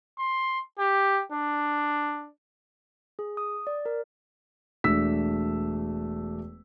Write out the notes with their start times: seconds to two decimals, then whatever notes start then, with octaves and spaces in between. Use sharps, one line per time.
0.19 C6
0.79 G4
1.32 D4
3.19 G#4
3.37 D#6
3.67 D5
3.86 A#4
4.84 E1 A3 D4 E6 B6